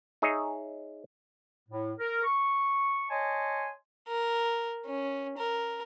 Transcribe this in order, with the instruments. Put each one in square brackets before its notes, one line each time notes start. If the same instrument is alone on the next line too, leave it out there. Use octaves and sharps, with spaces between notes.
[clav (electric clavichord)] D#4 G#4 C#5 D#5 E5
[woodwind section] A2
A#4
C#6
C#5 D#5 G#5 A5 C6
[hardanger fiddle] A#4
C#4
A#4